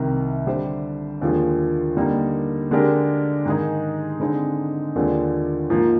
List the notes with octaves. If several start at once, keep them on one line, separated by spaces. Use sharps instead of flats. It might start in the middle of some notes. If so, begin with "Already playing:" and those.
Already playing: C2 C3 D#3
D3 G3 D4 G4 C5
D#2 D3 F3 G#3
D3 G3 A#3 D#4
D3 G#3 D4 G4 A#4
G#2 D#3 G#3 D#4 G#4
D3 G#3 C4 D#4
D#2 D3 F3 G#3 D4
G#2 F3 A#3